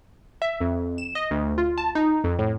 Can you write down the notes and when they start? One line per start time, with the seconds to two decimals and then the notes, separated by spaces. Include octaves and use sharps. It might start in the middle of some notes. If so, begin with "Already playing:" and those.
0.42 E5
0.61 F2
0.98 E7
1.15 D#5
1.31 D2
1.58 F4
1.78 A5
1.95 D#4
2.24 F2
2.39 A2